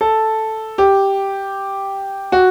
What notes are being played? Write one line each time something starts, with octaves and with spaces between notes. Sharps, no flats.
A4
G4
F#4